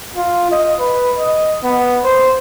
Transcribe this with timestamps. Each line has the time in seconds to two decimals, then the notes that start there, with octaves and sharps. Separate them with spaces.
0.16 F4
0.51 D#5
0.79 B4
1.18 D#5
1.63 B3
2.03 C5